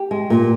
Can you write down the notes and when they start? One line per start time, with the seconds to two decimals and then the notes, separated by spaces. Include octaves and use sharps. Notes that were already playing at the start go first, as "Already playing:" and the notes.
Already playing: G4
0.11 G#3
0.30 A#2